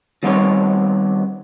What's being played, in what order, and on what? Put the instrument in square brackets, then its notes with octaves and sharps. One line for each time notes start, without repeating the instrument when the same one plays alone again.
[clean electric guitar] D#3 G3 B3 C4 G4 C#5